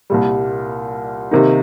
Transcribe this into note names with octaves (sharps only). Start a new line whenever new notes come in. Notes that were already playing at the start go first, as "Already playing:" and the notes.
C2 A#2 G3
C3 D#3 A#3 D#4